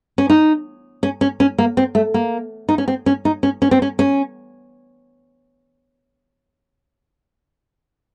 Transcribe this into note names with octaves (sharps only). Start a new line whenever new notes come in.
C#4
D#4
C#4
C#4
C#4
A#3
C4
A3
A#3
D#4
C#4
C4
C#4
D#4
C#4
C#4
C4
C#4
C#4